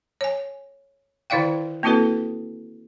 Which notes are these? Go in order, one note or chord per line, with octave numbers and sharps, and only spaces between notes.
C#5 G#5
D3 D#3 E4 D5 F5 G5
A#3 C4 E4 F#4 A4 B4